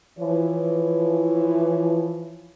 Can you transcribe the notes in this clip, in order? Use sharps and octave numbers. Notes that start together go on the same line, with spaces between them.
E3 F3 C#5